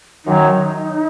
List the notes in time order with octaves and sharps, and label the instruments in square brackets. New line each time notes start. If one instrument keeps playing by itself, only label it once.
[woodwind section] F#2 D#3 F#3 [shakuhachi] D#4